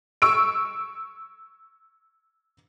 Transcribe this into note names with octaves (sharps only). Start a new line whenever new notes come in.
C#6 E6 D7